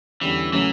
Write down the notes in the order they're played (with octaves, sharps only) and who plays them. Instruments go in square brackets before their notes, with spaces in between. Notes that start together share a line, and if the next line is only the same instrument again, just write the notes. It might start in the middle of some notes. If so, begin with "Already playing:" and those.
[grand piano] E2 D3 G3 C#4 [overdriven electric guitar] E3
[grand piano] C#3 F#3 A3 C#4 [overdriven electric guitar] E3